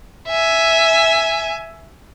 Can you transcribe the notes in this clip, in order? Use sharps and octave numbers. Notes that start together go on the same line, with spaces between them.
E5 G#5